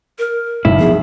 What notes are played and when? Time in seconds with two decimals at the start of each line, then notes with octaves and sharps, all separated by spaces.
0.19 A#4
0.65 F#1 B1 B2 E4
0.79 F3 B3 G#4